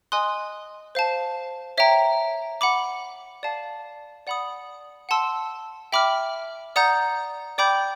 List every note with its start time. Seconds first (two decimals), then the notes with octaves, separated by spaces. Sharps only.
0.12 D#5 G#5 C6 D#6 F#6
0.95 C5 F5 A5
1.78 C#5 E5 G5 A#5
2.61 F#5 B5 D6
3.43 D5 F5 A5
4.27 D5 F#5 B5 D#6
5.09 F#5 A5 C6 E6
5.92 E5 G5 B5 D6 F6
6.76 D5 F#5 A#5 D#6 G6
7.58 D5 G5 B5 D6 G6